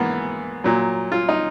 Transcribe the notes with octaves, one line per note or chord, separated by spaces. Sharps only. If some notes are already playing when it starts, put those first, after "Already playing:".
Already playing: G#2 E3 A#3 B3
A#2 F#3
F4
D#4